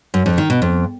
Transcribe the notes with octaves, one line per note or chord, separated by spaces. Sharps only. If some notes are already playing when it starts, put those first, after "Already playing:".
F#2
F2
D#3
B2
F2